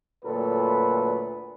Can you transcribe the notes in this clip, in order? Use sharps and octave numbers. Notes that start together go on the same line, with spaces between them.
D2 A#2 F#3 A4 B4